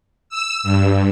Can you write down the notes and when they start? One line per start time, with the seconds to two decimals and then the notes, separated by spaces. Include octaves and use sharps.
0.29 E6
0.63 G2